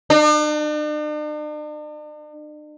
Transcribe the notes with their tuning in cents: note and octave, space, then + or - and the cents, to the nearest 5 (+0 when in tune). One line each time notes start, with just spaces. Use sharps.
D4 +45